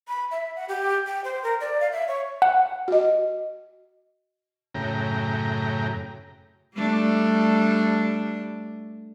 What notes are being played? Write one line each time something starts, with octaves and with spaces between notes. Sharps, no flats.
B5
E5
F#5
G4
G5
C5
A#4
D5
F5
E5
C#5
F#5
F#4 D#5
F#2 A2 C#3 G5 A#5
G3 A3 D4